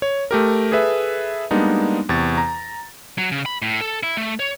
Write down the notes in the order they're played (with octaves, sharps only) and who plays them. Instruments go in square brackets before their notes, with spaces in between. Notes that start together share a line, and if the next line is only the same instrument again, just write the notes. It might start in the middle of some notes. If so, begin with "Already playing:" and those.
[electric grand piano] C#5
A3 G4 A#4
G#4 A4 B4 E5
G3 G#3 A#3 B3 D4 D#4
E2 C3 C#6 A6
A#5
[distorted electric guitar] F#3
C#3
B5
A2
A4
E4
A3
C#5